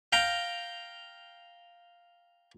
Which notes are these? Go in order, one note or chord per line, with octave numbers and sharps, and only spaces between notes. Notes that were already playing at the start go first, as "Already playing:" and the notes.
F5 G5 A#5